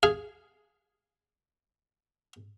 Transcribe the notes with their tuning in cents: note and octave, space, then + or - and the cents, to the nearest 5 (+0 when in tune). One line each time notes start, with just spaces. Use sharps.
G#4 +0 F5 -10